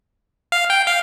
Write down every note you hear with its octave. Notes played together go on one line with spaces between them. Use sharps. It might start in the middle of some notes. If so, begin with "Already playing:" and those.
F5
G5
F5